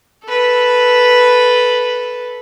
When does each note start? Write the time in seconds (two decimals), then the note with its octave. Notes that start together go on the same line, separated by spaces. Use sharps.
0.25 A4 B4